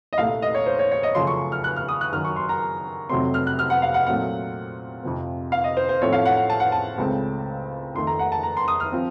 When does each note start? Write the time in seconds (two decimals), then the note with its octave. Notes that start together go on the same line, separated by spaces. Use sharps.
0.13 D#5
0.18 C2 A#2 A3 F5
0.42 D#5
0.55 C#5
0.66 C5
0.79 C#5
0.91 C#5
1.03 D#5
1.15 F#2 C#3 F3 A3 C6
1.27 C#6
1.52 F6
1.64 F#6
1.76 F6
1.89 D#6
2.01 F#6
2.12 F#2 D#3 F#3 F6
2.25 C#6
2.36 C6
2.49 A#5
3.09 F2 C3 F#3 A3 C4 C6
3.34 F6
3.47 F#6
3.59 F6
3.70 F#5
3.82 F5
3.94 F#5
4.06 A#2 F#3 A3 C4 F#5
5.03 F2 C3 F3 C4
5.52 F5
5.64 D#5
5.77 C5
5.89 C5
6.02 A2 F3 A3 C4 C#5
6.13 F5
6.26 F#5
6.37 F#5
6.50 A5
6.60 F#5
6.72 A5
6.98 C#2 C#3 A3 C4
7.95 F2 D#3 A3 C6
8.07 A#5
8.19 F#5
8.32 A5
8.43 A#5
8.57 C6
8.68 D#6
8.80 F6
8.92 F3 C4